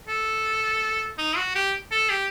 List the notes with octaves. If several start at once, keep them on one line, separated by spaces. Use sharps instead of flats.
A4
D#4
F#4
G4
A4
G4